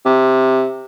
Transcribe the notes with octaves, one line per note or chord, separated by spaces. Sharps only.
C3